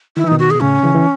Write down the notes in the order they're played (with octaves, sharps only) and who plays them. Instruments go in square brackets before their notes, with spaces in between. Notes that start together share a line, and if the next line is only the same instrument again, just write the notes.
[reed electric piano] D#3 [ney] E4
[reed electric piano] E3
[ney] D#4
[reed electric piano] B2 D#3
[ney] F#4
G#4
[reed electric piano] B2
[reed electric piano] A2 C#3 [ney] C#4
[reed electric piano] C#3 E3
E3